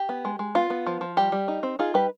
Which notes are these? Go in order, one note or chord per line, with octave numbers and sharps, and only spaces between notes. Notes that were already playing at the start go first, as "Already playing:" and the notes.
Already playing: G4
B3
G#3
G#3
B3 F4
B3
F3
F3
G3 G4
G3
D#4
C4
D#4 F4 G#4
G3 G4 B4